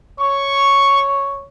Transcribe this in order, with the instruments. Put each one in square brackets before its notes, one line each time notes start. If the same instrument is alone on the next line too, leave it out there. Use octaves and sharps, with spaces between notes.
[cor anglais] C#5 [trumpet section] C#6